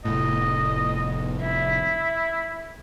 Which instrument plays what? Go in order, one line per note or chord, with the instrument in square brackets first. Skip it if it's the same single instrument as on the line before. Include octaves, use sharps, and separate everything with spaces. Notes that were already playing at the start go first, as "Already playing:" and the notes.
[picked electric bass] F1 A2 [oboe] D#5
[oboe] E4 [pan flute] E5